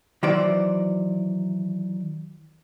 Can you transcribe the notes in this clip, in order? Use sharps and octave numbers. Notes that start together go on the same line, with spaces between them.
D#3 E3 F#3 C5 D5